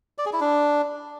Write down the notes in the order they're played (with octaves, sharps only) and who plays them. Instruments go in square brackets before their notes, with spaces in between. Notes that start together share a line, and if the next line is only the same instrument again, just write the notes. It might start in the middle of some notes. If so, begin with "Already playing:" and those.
[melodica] D5
G#4
E4
D4